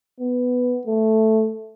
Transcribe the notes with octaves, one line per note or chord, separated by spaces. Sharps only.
B3
A3